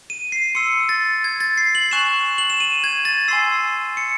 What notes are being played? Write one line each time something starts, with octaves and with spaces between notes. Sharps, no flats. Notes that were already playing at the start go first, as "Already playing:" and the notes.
D#7
C7
C6 E6 C#7
A6
G#6
A6
C7
F#7
G#5 C#6 F#6 E7
F#7
E7
D#7
G#6
A6
G#5 C6 E6 C7
C#7